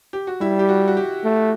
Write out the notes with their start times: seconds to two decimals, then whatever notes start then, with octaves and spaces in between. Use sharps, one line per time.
0.13 G4
0.27 F#4
0.41 G3 E4
0.59 G4
0.69 F#4
0.88 F#4
0.97 G4
1.24 A3